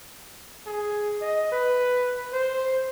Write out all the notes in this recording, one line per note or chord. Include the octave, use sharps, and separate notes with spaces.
G#4
D#5
B4
C5